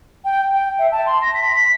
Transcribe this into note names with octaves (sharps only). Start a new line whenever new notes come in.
G5
G5
E5
A5
C6
A#6
B6
B6